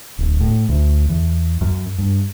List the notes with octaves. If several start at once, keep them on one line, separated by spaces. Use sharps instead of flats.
D1
A2
D2
E2
F#2
G2